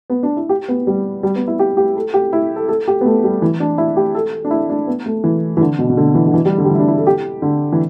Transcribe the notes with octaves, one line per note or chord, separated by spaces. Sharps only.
B3
D4
E4
G4
B3
G3
G3
B3
E4
G4
G4
A4
G4
E4
A4
A4
G4
B3
A3
G3
E3
D4
E4
G4
A4
D4
E4
D4
B3
A3
E3
E3
D3
B2
B2
D3
E3
D3
E3
G3
D3
G3
E3
E4
D4
E4
A4
G4
D3
E3